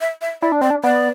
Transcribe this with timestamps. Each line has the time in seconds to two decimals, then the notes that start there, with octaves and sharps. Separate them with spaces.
0.01 E5
0.22 E5
0.42 E4 D5
0.52 D4
0.61 C4 D5
0.70 D4
0.83 B3 D5